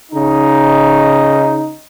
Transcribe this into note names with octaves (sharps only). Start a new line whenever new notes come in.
C#3 D#4